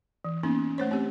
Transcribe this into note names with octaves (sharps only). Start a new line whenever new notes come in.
E3
A#3 B3 C#4 D#4
A3 C5 C#5
C4 G4